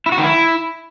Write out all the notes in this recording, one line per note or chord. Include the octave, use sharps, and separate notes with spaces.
E4
F#4
D#3
E4